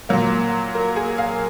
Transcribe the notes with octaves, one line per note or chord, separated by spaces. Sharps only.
A#2 F#3 A#3
A#4
G#4
F5